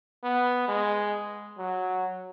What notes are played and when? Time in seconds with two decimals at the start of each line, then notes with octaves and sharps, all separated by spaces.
0.23 B3
0.68 G#3
1.58 F#3